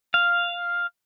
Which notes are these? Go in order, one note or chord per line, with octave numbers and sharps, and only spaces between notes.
F5